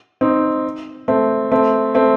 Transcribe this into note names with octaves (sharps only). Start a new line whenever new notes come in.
C4 D#4
A3 C4
A3 C4
A3 C4